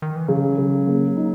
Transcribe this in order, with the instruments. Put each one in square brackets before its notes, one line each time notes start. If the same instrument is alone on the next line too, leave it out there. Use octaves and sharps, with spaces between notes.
[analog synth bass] D#3
E3
[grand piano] C#3 [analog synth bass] F#3
[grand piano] C#3
A#3
D#4